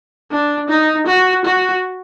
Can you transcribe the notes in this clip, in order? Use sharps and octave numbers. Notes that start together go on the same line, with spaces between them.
D4
D#4
F#4
F#4